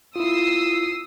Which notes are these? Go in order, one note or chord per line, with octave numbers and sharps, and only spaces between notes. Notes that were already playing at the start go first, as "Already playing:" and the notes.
E4 F4 D#6 E6 C7